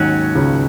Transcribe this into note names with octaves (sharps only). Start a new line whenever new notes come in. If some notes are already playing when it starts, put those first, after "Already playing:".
Already playing: D#2 G#2 D#3 F#3 C#4 F#4
C#2 C#3